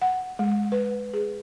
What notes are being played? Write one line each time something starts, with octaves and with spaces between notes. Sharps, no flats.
F#5
G#3
B4
G#4